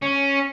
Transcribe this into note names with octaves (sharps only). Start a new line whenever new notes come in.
C#4